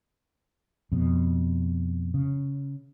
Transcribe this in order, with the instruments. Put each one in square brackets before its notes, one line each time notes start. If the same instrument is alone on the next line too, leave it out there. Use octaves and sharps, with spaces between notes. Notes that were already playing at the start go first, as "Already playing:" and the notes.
[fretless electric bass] F2 B2
C#3